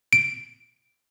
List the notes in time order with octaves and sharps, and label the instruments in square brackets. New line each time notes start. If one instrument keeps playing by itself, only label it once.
[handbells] D7